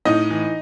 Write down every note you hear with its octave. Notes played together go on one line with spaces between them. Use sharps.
A2 D#4 D#5
E3